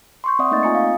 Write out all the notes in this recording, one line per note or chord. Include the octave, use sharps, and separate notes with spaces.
C6 C#6 G6
C4 D5 E5 F#5 C#6 D#6
A3 A#3 D#4 D#5 G6 A6
C4 F4 G#5 A#5 D#6 C#7
F5